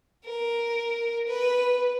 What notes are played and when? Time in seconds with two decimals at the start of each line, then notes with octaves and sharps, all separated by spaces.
0.25 A#4
1.27 B4